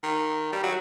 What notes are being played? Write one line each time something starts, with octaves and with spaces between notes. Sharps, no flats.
D#3
G3
F#3